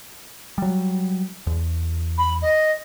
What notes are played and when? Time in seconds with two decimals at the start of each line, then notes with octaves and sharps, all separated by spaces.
0.58 F#3 G3
1.47 E2
2.18 B5
2.42 D#5